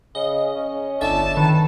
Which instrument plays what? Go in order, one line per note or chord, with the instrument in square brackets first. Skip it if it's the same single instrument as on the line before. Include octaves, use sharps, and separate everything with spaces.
[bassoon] C#3 [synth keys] D#5
[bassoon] C#4
[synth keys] G1 E5 A6 [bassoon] D3 [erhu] A5
[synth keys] D#3 [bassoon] B4